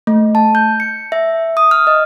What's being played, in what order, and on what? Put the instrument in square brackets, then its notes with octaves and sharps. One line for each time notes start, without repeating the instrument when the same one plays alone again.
[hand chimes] A3
A5
G6
C#7
E5
D#6
F6
D#5